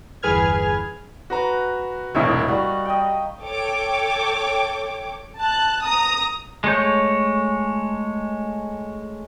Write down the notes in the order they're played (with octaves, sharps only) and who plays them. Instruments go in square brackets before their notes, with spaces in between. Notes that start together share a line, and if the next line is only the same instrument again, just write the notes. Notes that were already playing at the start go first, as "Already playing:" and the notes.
[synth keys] G1 E2 G#4 B4 F6 G#6
[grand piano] F#4 B4 A#5
[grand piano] E1 C2 A2 [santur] A#3 D#5 C#6
[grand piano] G3 [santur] F#4
[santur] D#5 G5
[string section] A4 C#5 G5 D6
[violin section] A5 F#6
A#5 D#6
[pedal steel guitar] G#3 A3 C#5 G6